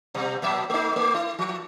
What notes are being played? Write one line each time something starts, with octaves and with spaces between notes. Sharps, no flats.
B2 G3
A#2 F#3 E5
A3 D#4
A3
E4
F3